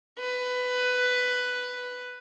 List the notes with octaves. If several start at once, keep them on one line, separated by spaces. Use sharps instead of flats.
B4